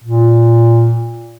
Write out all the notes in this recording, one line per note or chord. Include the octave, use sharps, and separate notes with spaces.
A#2